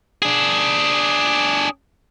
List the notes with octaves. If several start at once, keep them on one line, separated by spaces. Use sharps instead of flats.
D4 G#4